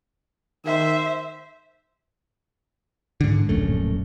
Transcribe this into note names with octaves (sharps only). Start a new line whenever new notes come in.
D#3 C5 E5
G#2 D3
D1 A#1 F#2 A3